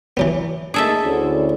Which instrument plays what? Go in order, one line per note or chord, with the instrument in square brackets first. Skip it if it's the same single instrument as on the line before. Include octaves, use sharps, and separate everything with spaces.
[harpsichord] E3 F#3 B3
[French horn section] A3 A#3 D#4 [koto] G#4 A4 E5
[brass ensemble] D2 [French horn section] D3 C#4 E4